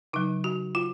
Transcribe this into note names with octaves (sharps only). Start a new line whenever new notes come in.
C#3 F#3 D#4
F#4
F4